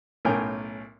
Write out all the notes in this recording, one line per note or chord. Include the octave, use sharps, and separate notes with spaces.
B1 A2 C#4 A#4 G5 G#5